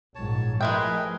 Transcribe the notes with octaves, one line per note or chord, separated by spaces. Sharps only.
A#1 G#2 C#5 A5
F3 G#3 A3 E4 G#4 A#4 B4 G5